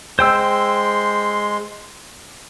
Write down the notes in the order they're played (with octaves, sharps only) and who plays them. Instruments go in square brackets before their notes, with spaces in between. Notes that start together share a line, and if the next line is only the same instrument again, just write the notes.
[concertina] G#3 C6 [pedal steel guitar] C5 G5 E6